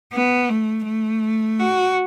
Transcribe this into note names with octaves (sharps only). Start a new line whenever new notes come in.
B3
A3
A3
F#4